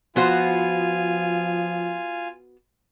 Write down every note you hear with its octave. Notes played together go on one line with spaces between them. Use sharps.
F3 B3 F4 F#4 C5 G#5